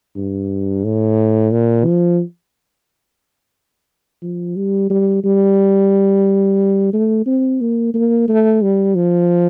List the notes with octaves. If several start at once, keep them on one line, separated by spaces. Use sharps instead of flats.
G2
A2
A#2
F3
F3
G3
G3
G3
A3
C4
A#3
A#3
A3
G3
F3